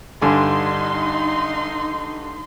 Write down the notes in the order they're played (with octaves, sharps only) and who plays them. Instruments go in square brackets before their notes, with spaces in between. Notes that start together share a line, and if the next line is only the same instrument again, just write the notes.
[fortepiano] G2 D3 G#5 [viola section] D#4 C6